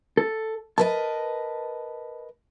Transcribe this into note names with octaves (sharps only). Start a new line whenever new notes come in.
A4
A#4 B4 D#5 A5